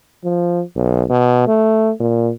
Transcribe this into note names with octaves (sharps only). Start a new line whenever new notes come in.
F3
B1
B2
A3
A#2